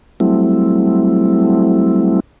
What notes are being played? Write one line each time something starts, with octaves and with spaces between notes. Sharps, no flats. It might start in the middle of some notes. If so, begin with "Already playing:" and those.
F#3 G3 A3 C4 E4